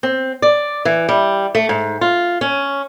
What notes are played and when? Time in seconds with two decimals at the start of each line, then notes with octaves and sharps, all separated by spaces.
0.03 C4
0.42 D5
0.85 E3
1.09 G3
1.55 A3
1.69 G#2
2.01 F4
2.41 C#4